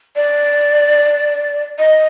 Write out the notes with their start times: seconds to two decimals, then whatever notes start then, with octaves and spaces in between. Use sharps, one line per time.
0.16 D5
1.79 D#5